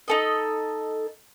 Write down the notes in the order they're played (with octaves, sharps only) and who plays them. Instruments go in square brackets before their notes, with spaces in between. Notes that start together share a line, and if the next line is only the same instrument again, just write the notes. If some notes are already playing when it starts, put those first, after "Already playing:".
[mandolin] D#4 A4 D#5